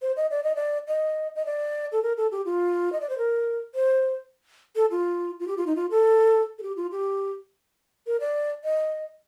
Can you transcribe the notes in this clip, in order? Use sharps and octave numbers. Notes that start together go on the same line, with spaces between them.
C5
D#5
D5
D#5
D5
D#5
D#5
D5
A4
A#4
A4
G4
F4
D#5
D5
C5
A#4
C5
A4
F4
F4
G4
F4
D#4
F4
A4
A4
G4
F4
G4
A#4
D5
D#5